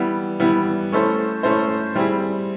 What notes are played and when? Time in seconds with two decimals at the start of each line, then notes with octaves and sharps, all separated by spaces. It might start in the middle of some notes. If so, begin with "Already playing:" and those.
Already playing: E3 G3 B3 E4
0.40 E3 G3 B3 E4
0.92 A3 C#4 E4 A4 C5
1.43 A3 C#4 E4 A4 C5
1.95 G3 C4 E4 G#4